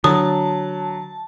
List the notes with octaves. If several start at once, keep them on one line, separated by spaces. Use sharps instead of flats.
D3 F#3 A5 D#6